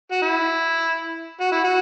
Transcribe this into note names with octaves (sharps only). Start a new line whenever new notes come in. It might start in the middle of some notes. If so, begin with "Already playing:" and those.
F#4
E4
F#4
E4
F#4